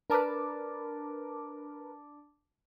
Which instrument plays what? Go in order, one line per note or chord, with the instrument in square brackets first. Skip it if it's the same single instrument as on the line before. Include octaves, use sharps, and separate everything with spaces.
[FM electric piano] D4 A5 D6 [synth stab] A#4 B4